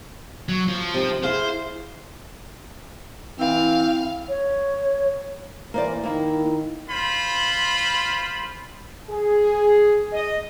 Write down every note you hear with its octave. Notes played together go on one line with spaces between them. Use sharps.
F#3
F3
C3 D#4
E4 G#4 C5 F5
E3 C4 F5
C#5
E3 A#3 C5 D5
D#3 A#3 E4
F4 C5 B5
G#4
D#5